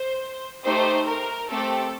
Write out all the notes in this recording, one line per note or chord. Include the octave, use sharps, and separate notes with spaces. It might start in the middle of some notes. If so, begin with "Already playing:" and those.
Already playing: C5
A3 D#4 G4 C5
A#4
A3 C4 G4 A4